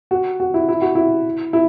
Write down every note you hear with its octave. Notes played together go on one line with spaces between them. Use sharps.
F#4
F#4
E4
E4
F#4
E4
E4